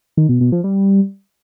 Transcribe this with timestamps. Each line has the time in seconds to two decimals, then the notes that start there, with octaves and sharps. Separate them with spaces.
0.17 D#3
0.29 B2
0.41 B2
0.52 F3
0.64 G3